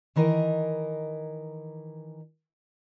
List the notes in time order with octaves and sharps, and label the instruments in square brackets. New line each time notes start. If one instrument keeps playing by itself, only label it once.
[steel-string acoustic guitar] D#3 E3 A#4 C5 D#5